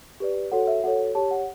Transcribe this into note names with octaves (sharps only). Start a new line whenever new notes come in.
G4 B4 D5
F#4 A4 C#5 F#5
E5
F#4 A4 C#5 F#5
G4 C#5 A5
F#5